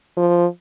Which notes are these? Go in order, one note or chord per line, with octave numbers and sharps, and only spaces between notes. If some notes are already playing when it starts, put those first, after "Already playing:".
F3